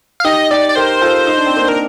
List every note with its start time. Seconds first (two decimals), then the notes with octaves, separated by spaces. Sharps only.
0.20 F5
0.24 D#4 G4 D#5
0.51 D#4 G4 D5
0.69 D5
0.76 G4 A#4 C5
1.01 F4 A4
1.27 D#4
1.37 D4
1.46 C4
1.56 A#3 D4
1.69 A#4